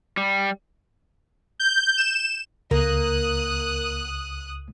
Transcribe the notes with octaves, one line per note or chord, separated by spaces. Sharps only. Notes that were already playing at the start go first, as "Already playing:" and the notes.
G3
G6
E7
C#2 A#3 D#6 F#6